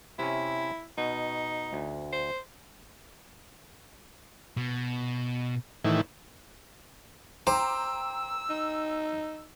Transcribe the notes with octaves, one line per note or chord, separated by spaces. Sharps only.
C3 C#4 E4
B2 D#4
D2
C5
B2
A2 D#3 E3
C5 G5 A#5 D6 E6
D#4